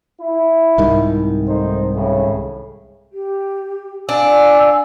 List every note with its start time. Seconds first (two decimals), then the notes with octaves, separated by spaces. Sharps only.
0.21 E4
0.78 C2 G#2 D#3
1.48 A3 D#4 C5
1.95 A2 C#3
3.12 G4
4.09 D4 F5 G#5 E6